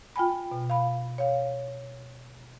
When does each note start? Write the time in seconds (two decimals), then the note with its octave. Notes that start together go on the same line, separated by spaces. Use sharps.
0.16 F4 G5 G#5 B5
0.51 B2
0.70 F5 B5
1.18 C#5 F5